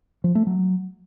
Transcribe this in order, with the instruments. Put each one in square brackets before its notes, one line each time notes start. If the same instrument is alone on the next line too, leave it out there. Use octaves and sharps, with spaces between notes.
[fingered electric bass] F3
A3
F#3